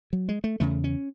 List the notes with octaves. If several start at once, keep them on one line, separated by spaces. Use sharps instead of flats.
F#3
G#3
A3
E2 C#3 A3
C#4